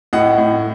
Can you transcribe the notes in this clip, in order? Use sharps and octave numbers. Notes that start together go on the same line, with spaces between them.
A2 D#5 F#5
A2